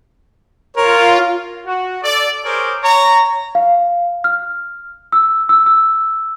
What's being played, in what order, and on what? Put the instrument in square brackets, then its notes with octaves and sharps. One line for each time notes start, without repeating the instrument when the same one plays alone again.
[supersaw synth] F4 [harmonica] A#4 C#5
[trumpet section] F#4
A4 D5
G#4 A#4 C5 C#5 D6
C#5 A#5
[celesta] F5
F6
E6
E6
E6